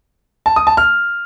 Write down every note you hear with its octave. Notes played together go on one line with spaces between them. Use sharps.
A5
D#6
A5
F6